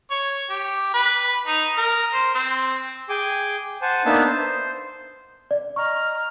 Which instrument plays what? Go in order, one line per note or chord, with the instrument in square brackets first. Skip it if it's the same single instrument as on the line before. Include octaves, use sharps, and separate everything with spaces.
[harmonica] C#5
G4
B4
D#4
A#4
C5
C4
[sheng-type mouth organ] G#4 G5 G#5 D6
C5 F#5 G#5 A5
A#3 B3 D4 D#4 E5 A5
C5
[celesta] D5
[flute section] D#5 A#5 F6 [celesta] C#6